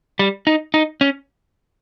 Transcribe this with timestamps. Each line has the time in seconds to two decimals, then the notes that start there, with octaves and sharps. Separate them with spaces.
0.19 G3
0.47 D#4
0.74 D#4
1.01 C#4